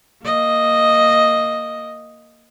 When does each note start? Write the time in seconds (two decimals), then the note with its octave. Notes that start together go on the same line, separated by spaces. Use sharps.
0.24 A#3 D#5